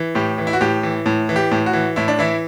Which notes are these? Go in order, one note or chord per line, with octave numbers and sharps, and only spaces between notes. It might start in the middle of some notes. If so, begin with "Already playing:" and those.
Already playing: E3
A2 G4
E3
E4
F#4
A2 G4
E3
A2
E3
G4
A2
F#4
E3
A2 E4
D4
E3 E4